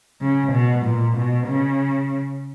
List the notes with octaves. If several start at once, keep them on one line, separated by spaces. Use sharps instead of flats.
C#3
B2
A#2
B2
C#3